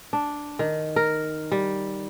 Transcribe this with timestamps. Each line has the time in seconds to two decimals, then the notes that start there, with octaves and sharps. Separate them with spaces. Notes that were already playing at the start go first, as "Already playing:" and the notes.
0.13 D4
0.59 D#3
0.96 A#4
1.52 G3